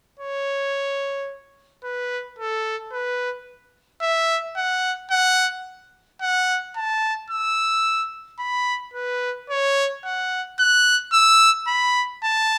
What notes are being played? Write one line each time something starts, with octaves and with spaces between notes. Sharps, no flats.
C#5
B4
A4
B4
E5
F#5
F#5
F#5
A5
E6
B5
B4
C#5
F#5
F#6
E6
B5
A5